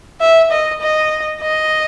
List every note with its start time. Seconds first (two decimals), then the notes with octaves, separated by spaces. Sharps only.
0.21 E5
0.51 D#5
0.81 D#5
1.41 D#5